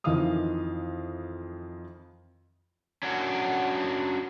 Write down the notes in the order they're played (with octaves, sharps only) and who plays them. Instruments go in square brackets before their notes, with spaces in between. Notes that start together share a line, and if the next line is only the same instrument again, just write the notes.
[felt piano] F2 D#3 E3 D#5 F5 D#6
[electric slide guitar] C#4 D4 F#4